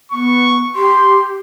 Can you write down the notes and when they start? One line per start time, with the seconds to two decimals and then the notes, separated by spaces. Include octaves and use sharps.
0.12 B3 C#6
0.75 G4 C6